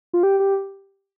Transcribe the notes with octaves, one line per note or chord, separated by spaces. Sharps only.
F4
G4
G4